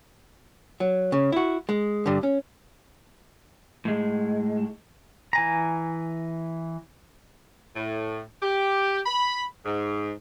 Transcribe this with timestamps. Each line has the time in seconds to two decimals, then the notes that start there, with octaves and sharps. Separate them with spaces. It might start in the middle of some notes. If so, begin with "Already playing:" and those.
0.80 F#3
1.12 C#3
1.32 E4 F#4
1.69 G#3
2.06 G2 D3
2.23 C#4
3.85 A2 G#3
5.33 E3 G#5 A#5
7.76 A2
8.42 G4
9.06 B5
9.65 G#2